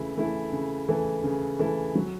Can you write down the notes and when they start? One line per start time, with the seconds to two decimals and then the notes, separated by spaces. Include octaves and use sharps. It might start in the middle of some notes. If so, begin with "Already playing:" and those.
Already playing: C#3 E3 A3 E4
0.17 E3 A3 E4 A4
0.52 C#3
0.88 E3 A3 E4 A4
1.24 C#3
1.59 E3 A3 E4 A4
1.95 F#3